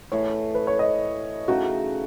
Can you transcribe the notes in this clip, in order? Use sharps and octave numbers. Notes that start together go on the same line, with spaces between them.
A2 E3 A3 C#5
B4
C#5
D#5
C#3 E3 A3 D#4 F#4